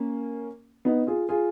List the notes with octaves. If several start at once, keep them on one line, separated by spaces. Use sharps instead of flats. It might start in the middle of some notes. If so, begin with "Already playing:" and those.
Already playing: A#3 C#4
B3 D#4
F4 G#4
F4 G#4